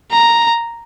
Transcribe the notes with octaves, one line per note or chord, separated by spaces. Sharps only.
A#5